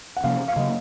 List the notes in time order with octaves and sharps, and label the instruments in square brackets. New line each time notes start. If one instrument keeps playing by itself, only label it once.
[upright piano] F#5
[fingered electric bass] C3 F3 A#3 C#4 [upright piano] F5
[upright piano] F5
[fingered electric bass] C#3 F#3 A#3 [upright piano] D#5